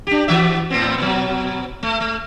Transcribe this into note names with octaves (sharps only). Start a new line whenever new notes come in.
D4 G4
E3 F#4 E5
A2 B3 C4
B2 F#3
A3
A3